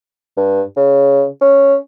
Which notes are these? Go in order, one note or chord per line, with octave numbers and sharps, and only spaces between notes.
G2
C#3
C#4